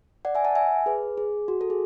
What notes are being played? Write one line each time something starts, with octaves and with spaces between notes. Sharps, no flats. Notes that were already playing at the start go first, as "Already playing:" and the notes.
D5 F#5
E5 G#5
F#5 A5
E5 G#5
G#4 B4
G#4
F#4
A4
G#4